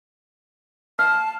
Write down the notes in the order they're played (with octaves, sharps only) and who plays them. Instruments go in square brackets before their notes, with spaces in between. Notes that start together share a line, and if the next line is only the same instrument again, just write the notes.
[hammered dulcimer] F5 [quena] A5